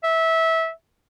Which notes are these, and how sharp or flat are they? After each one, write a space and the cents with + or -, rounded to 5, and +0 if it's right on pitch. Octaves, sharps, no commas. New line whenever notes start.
E5 -20